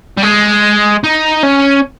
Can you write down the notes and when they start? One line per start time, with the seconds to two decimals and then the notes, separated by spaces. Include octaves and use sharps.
0.17 G3
0.23 G#3
1.04 D#4
1.43 C#4